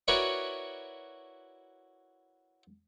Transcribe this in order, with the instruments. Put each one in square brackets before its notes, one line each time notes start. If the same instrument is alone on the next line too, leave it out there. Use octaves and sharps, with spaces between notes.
[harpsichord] E4 F#4 A#4 B4 C#5 D5